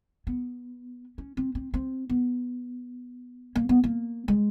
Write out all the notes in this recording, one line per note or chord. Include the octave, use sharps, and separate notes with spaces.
B3
C#4
C4
C4
C4
B3
A#3
B3
A#3
G#3